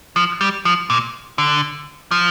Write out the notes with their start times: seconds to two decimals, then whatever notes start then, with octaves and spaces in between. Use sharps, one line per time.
0.16 F3
0.41 G3
0.65 F3
0.90 A#2
1.38 D3
2.11 F3